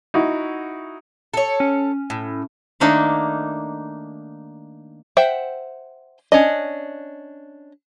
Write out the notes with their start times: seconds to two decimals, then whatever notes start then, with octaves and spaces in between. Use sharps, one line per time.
0.14 D#4 E4 F#4
1.34 A4 C#5
1.60 C#4
2.10 A2
2.80 D#3 A3 A#3 D4 D#4
5.17 C5 E5 F#5 G5
6.32 C#4 D4 D#5